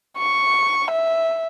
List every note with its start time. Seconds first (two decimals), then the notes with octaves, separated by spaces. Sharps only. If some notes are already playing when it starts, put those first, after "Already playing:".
0.18 C#6
0.91 E5